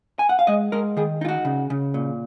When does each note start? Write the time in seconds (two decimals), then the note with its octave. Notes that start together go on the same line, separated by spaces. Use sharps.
0.19 G#5
0.29 F#5
0.39 F5
0.47 G#3 D#5
0.72 G#3 A#4
0.97 D#3 G#4
1.21 D#4 F4
1.28 F#4
1.45 C#3
1.70 C#3
1.94 A#2